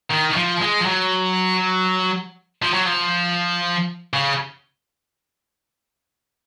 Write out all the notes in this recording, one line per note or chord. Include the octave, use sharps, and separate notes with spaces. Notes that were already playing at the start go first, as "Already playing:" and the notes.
D#3
F3
G#3
F3
F#3
F3
F#3
F3
C#3